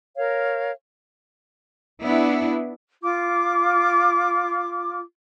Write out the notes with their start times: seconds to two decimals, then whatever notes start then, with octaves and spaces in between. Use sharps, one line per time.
0.17 A#4 C#5 F5
2.02 B3 D4 E4
3.02 F4 D6